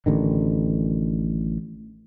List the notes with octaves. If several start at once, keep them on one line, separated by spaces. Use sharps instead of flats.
A1 D3 D#3